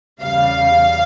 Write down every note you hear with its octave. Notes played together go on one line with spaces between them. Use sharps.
E2 C#3 G3 F5